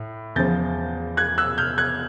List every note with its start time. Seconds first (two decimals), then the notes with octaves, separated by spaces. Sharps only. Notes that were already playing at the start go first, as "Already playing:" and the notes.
Already playing: A2
0.36 E2 C#3 F3 G6 A6
1.17 F#6 G#6
1.38 E6 F#6
1.58 F6 G6
1.78 F#6 G#6